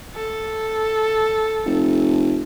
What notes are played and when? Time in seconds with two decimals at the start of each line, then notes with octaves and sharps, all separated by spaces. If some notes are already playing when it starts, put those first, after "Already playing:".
0.14 A4
1.66 F1